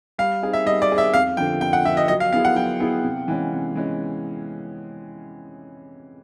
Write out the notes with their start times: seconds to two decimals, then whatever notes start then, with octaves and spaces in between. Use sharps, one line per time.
0.18 G3 F5
0.42 C4 D#4 G#4
0.53 E5
0.66 G3 D#5
0.82 D5
0.89 C4 D#4 G#4
0.98 E5
1.14 F2 F5
1.37 D3 F3 G5
1.61 F2 G5
1.73 F#5
1.85 D3 F3 E5
1.97 D#5
2.08 F#3 D#5
2.20 F5
2.33 B3 E4 G#4 F5
2.45 F#5
2.56 F#3 G5
2.80 B3 E4 G#4
3.04 C3
3.28 E3 G#3 C#4
3.52 C3
3.75 E3 G#3 C#4